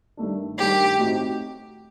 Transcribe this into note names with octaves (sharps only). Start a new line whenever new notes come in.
G2 D#3 A3 D4
G2 D#3 A3 D4 G4
A2 A3 C4 D#4 F#4